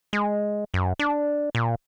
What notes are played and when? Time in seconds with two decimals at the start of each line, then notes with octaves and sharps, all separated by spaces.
0.13 G#3
0.74 F#2
0.99 D4
1.55 A#2